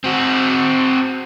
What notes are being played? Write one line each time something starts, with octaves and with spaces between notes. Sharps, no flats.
C4 F#4